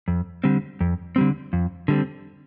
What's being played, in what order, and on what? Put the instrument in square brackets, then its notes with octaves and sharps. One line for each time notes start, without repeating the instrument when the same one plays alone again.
[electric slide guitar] F2
D3 G3 C4
F2
D3 G3 C4
F2
D3 G3 C4